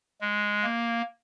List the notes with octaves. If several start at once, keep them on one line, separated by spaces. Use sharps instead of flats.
G#3
A#3